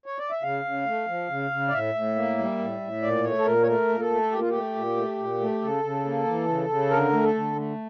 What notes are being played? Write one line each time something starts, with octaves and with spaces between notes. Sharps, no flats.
C#5
D5
E5
C#3 F5
C#3
A3
F3
C#3
C#3
D5
A2 E5
A2
A#3
G3
A2
A2
A#2 D5
A3 C#5
A4
A#2 A#4
C#5
A3 A#4
A#2
A4
A3
A#2 G4
F4
A3 G4
A#2
A3
A#2
A3
C#3 A4
C#3
A#3
E3
C#3
C#3
D3 A#4
A3
A4
D3
A3